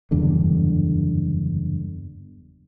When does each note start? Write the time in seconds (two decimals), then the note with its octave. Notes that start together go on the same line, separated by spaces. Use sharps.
0.11 F#1 E2 G2 D3